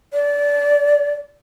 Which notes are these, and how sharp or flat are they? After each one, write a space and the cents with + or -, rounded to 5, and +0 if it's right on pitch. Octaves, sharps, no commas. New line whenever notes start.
D5 -25